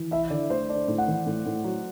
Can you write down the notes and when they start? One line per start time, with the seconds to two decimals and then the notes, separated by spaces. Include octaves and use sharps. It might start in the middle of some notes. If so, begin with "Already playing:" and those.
Already playing: E3
0.11 E4 E5
0.30 D3 D5
0.50 A3 C5
0.69 D4 D5
0.88 A2
0.98 F#5
1.08 E3
1.26 A2
1.46 A2
1.64 F#3